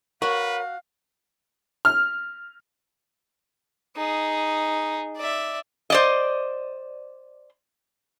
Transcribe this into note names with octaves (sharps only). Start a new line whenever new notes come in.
F#4 A#4 B4 C#5 F5
F6
D#4 G#4
D5 E5
C5 D5 D#5